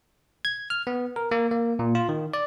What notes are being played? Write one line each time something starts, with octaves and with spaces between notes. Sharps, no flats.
G#6
F6
B3
A#4
A#3
A#3
A#2
F4
D#3
D5